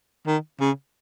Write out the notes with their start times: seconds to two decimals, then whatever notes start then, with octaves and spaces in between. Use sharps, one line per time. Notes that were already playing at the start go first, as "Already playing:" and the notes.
0.27 D#3
0.60 C#3